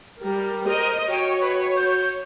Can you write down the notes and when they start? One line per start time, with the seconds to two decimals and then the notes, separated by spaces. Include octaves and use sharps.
0.24 G3 G4 A#4
0.67 A#4 C5 D#5
1.09 F#4 C#5 G5
1.41 B4
1.77 G6